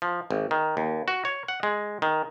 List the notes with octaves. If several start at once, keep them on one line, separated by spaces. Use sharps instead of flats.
F3
G#1
D#3
D#2
F#4
C#5
F#5
G#3
D#3